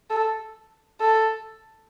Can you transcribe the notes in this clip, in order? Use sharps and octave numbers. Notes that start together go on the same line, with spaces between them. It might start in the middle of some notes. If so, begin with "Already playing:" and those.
A4
A4